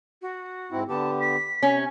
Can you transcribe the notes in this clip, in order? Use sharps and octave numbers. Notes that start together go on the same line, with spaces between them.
F#4
G#2 C4 E4
D3 B3 G4 A5
B6
C3 C#4